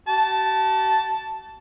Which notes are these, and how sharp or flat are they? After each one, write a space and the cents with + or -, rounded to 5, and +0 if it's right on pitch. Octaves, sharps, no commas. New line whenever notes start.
F#4 +45 A5 +0